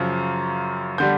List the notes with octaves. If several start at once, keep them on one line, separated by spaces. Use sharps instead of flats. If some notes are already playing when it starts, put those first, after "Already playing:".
Already playing: F#2 C#3 F3
D3 G3 G6